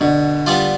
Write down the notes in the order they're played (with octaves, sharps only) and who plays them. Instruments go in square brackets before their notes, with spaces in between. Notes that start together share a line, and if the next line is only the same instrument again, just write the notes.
[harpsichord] B2 [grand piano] D3
[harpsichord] G3 B3 D4 F4